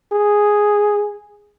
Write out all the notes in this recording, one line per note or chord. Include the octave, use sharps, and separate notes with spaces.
G#4